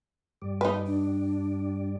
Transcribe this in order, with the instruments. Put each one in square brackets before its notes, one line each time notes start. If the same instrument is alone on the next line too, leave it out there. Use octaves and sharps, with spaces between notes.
[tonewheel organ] G2 G3 D5
[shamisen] D#4 B4
[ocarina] D4